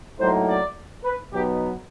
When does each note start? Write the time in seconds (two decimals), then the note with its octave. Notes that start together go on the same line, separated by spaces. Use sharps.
0.20 A2 F#3 A#3 D#4 C5
0.49 D5
1.05 B4
1.33 B2 F#3 B3 D#4 G4